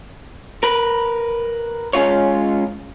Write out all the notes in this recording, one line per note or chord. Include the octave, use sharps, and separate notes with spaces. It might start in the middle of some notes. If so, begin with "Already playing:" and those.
A#4 B4
G#3 C#4 F4 C#5